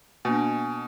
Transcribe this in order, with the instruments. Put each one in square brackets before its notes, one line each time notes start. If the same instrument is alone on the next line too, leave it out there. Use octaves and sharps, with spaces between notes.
[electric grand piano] B2 [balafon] A#3 D4 [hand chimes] G#5